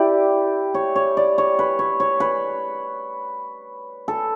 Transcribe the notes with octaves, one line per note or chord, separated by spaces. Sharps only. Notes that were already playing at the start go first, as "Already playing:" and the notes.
Already playing: E4 G4 D5
C#5
C#5
D5
C#5
B4
C#5
C#5
B4
A4